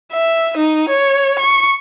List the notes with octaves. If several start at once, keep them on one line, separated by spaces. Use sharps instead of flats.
E5
D#4
C#5
C#6